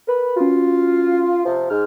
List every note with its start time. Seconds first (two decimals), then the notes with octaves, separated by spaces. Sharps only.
0.07 A#4 B4 B5
0.36 C#4 F4 F#4
1.45 C3 F3
1.70 G#2 F6